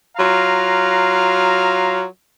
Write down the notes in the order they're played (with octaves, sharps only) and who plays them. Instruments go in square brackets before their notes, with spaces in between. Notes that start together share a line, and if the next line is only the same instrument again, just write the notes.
[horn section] F#3 F4 F5 A#5